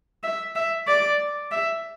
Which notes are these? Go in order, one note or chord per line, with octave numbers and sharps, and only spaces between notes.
E5
E5
D5
E5